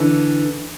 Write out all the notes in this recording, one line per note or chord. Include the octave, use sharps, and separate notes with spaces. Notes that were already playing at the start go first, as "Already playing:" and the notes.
Already playing: D3 E3